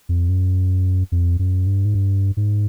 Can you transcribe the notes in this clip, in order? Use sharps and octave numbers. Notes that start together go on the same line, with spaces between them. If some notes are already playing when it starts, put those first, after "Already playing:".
F2
F#2
F2
F#2
G2
G#2
G2
G#2